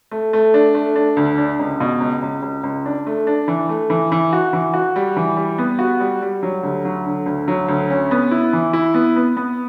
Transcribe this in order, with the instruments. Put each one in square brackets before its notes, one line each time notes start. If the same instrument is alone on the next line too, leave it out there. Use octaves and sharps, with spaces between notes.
[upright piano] A3
A3
D4
A3
D4
D2
D4
C#2
B2
C#2
C#2
C#2
C#2
D4
A3
D4
E3
A3
E3
E3
F#4
E3
F#4
G3
E3
G3
B3
F#4
G3
G3
F#3
D2
F#3
D3
D2
F#3
D2
C#4
B3
E4
E3
E4
B3
B3
B3